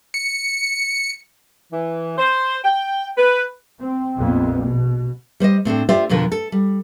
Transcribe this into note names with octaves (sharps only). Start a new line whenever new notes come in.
C#7
E3
C5
G5
B4
C4
A#1 F2 A#3 B3
B2
G3 C5 C#5 D#5
A2 C4 D4 A4
F4 G4 C5 D5 E5
F2 B2 D3 F3 A#4
A4
G3